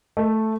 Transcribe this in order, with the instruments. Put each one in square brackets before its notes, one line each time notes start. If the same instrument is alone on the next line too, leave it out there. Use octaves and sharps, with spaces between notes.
[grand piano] A3